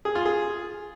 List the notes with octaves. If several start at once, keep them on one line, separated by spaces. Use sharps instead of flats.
G#4
F4
G#4